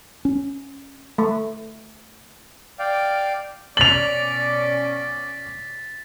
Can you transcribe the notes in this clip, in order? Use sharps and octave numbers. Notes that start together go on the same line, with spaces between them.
C#4
A3
D5 F5 G5
B2 C#4 D5 A6 B6 F7 F#7